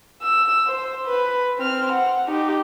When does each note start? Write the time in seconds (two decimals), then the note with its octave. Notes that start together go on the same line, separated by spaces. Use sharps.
0.22 E6
0.67 C5
1.06 B4
1.58 C4 F6
1.92 F#5
2.28 D#4 G4